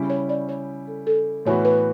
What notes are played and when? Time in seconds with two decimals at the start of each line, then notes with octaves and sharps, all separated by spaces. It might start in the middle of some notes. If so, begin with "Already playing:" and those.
Already playing: C#3 G3 C#4 E4 G4
0.10 C#5
0.29 D5
0.49 C#5
0.88 A4
1.07 A4
1.45 A2 E3 B3 F#4 C#5
1.65 B4